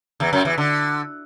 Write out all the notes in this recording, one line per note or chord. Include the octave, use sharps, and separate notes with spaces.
E2 E3
F#2 F#3
E2 E3
D3